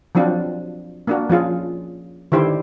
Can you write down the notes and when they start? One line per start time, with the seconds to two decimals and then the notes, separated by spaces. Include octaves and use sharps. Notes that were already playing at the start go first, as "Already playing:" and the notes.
0.15 F3 F#3 C4 D4 F4
1.07 A#3 D4 F#4
1.30 F3 C#4 F4 G#4
2.32 D3 D#3 E4 G4 C5